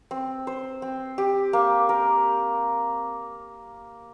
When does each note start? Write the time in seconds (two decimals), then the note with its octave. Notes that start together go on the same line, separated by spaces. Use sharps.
0.11 C4
0.47 C5
0.82 C4
1.18 G4
1.53 A#3
1.89 A#4